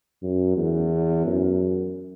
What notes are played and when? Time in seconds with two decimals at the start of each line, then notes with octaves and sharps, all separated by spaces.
0.23 F#2
0.57 E2
1.26 F#2